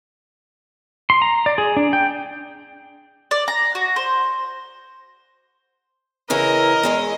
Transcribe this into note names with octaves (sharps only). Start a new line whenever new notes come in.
C6
A#5
D5
G#4
D4
G5
D5
A#5
F#4
C5
C#3 E3 E4 A#4 D#5
E2 G#3 C#4